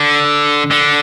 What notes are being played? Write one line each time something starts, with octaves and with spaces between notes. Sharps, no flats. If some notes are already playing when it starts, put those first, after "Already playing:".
Already playing: D3
D3